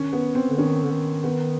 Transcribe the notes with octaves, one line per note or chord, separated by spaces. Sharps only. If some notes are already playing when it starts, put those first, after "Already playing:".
Already playing: D#3 C#4
B3
C4
D3
D#3 C#4
D3
D#3
B3